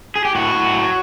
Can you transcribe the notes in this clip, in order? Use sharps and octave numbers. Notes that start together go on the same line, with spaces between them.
G#4
G4
A2 F#4
A2
F#3